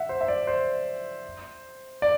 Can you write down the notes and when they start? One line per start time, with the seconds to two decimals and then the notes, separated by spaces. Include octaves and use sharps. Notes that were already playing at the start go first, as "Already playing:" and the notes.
Already playing: E5 F#5
0.09 C5
0.21 E5
0.28 D5
0.47 C5
2.02 D5